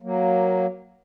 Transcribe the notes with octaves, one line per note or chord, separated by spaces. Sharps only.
F#3 A#3